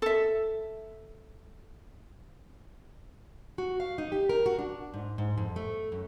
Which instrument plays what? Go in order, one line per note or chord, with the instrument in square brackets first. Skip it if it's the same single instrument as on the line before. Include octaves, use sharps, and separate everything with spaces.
[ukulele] A4 E5
[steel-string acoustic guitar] F#4
F5
D#4
G4
A#4
F#4
D4
G#2
G#2
F2
A3
F#2